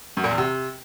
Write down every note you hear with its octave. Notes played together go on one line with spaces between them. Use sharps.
F#2
A#2
E2
C3